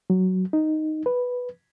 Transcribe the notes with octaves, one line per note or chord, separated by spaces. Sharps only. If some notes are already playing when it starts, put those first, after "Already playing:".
F#3
D#4
B4